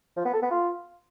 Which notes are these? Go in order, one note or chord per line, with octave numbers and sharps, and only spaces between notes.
F3
B3
A4
B3
F4